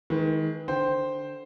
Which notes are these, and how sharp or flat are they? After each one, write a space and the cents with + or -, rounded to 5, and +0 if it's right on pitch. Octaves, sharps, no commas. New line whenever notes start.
D#3 +30 G#3 +25 B4 +0
D3 +0 C5 +0 G5 +0